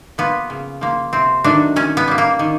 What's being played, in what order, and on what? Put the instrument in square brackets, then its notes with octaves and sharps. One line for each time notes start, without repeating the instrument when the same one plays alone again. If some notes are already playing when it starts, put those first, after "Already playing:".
[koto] F3 A#3 B3
C#3
F3 A#3
C3 C4
D#3 F#3 A3 D4
D#3 C#4
B3
G3 A#3
A#3
D#3